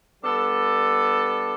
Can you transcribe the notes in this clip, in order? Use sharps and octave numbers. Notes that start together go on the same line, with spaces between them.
G3 B3 D4 A4